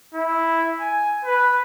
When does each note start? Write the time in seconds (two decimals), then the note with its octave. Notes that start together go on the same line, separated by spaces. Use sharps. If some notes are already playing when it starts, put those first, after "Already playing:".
0.14 E4
0.80 G#5
1.25 B4